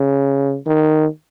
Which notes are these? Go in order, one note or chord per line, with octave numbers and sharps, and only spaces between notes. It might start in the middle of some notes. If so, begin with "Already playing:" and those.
Already playing: C#3
D#3